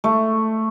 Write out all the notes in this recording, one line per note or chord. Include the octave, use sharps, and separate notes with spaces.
A3